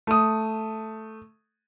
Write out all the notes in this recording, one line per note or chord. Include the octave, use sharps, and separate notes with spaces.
A3 D#6